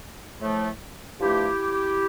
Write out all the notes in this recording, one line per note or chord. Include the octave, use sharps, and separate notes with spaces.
A2 F3 A3
G2 F3 A3 E4 G4